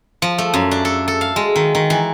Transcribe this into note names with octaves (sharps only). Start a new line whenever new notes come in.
F3
A3
F#2
D4
A4
A4
F5
G#3
D#3
D#3
E3